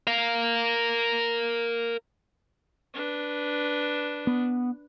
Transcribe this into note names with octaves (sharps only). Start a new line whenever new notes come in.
A#4 F5
D4 B4
B3